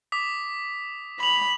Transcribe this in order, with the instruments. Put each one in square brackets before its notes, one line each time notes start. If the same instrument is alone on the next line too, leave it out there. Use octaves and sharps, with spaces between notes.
[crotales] D6 D#6 B6
[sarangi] B5 [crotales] F7 F#7